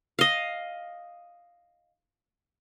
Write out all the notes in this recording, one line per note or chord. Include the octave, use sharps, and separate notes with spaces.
D#5 F5